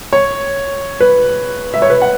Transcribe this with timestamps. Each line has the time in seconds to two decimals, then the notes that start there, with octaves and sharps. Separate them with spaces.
0.13 C#5
1.01 B4
1.74 E5
1.82 C#5
1.90 B4
2.02 F#5